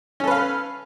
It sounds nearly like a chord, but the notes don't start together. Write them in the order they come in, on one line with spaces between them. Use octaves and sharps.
C#4 A4 B4 F5